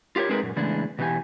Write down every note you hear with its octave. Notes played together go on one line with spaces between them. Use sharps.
F4 G4 A#4 C#5
G#3 C4 D#4 G#4 A#4 B4
F#2 A#2
A2 C#3 E3 G#3 B3 D4
B2 E3 B3 G4 G#5